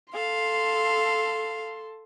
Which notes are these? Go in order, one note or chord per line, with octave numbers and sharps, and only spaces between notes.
A4 F5 C6